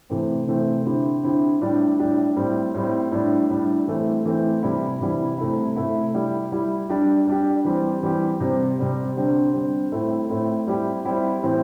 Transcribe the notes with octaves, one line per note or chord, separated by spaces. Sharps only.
C3 E3 A3 C4
C3 E3 A3 C4
D3 C4 E4 G4
D3 C4 E4 G4
A2 G3 D4 G4
A2 G3 D4 G4
A2 G3 C4
A2 G3 C4
A2 G3 D4
A2 G3 D4
E3 A3 C4
E3 A3 C4
C3 E3 G3 E4
C3 E3 G3 E4
C3 A3 E4
C3 A3 E4
G3 E4 G4
G3 E4 G4
G3 D4 G4
G3 D4 G4
E3 G3 C4 G4
E3 G3 C4 G4
C3 G3 C4
C3 G3 C4
D3 G3 C4
D3 G3 C4
A2 A3 C4 E4
A2 A3 C4 E4
G3 C4 E4 G4
G3 C4 E4 G4
A2 E3 C4